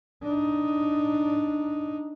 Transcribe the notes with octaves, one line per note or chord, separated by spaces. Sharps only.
D4 D#4